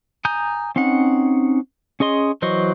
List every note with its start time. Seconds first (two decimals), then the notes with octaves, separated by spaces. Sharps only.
0.25 G#5 A#5 D#6 G6
0.76 C4 C#4 D#4 F#5
2.00 C#4 G#4 D#5 C6
2.42 E3 F#3 C5 D#5 C#6